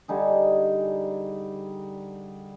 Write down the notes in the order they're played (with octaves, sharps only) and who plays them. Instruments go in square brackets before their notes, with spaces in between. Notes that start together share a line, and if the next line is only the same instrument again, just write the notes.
[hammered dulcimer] D3 G3 D#4 G#4